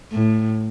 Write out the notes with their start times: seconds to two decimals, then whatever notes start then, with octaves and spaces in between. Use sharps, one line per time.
0.12 A2